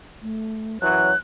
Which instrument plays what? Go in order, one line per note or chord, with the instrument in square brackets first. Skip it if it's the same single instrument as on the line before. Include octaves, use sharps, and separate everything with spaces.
[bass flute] A3
[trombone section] F#2 E3 F#3 [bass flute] C#5 [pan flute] F#6